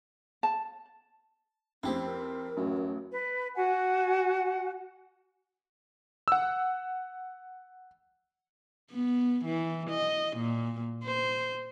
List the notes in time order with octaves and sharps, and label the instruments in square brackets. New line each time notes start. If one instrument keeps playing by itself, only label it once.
[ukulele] A5
[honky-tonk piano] F2 C4 [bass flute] C#4 [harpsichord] E4 G4
[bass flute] A#4
[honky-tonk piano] A1 [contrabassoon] F#2
[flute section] B4
F#4 F#5 G#5
[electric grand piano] F#5 E6
[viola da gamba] B3
E3
D#5
A#2
C5